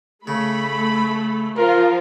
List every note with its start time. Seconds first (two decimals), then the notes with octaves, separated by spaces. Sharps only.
0.27 C#3 A3 B5
1.57 F3 F4 A#4